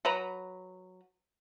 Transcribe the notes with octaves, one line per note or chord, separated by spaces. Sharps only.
F#3 B4 A#5